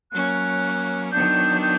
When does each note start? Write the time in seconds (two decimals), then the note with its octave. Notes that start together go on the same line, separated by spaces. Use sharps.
0.12 F#3 A#3 C#4 F#6
1.12 D#3 F#3 B3 D4 G6
1.63 G6